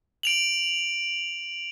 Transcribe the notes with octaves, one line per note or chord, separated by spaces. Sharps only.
D7 F7 F#7